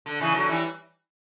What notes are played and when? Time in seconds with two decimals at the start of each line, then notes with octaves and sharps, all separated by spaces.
0.06 D3
0.20 C#3 E3
0.35 D3 F#3
0.49 E3 G3